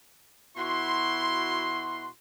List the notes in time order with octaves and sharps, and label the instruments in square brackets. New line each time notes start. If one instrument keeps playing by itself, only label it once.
[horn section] B2 E4 F#4 C6